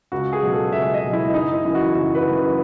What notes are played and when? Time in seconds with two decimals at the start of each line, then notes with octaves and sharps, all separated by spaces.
0.12 C#2 F#4
0.33 G#4
0.42 B2 F#3
0.53 A4
0.72 C#2 E5
0.93 D#5
1.04 B2 F#3
1.13 E4
1.34 F#1 D#4
1.54 E4
1.65 F#2 E3
1.75 F#4
1.95 F#1 F#4
2.15 B4
2.26 F#2 E3
2.36 B4